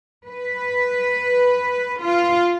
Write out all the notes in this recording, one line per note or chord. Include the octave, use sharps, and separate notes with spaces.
B4
F4